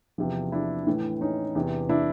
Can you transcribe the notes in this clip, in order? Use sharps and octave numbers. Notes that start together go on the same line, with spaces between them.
E2 C3 F3
D4 E4
A2 E3
C#4 D#4
E2 C3 E3
D4 E4